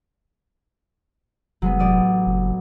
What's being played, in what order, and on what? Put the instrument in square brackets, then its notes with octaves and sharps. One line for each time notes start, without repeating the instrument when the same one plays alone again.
[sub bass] F1 [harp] F#3 G#3 B3
[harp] A1 D5 D#6
[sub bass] F#1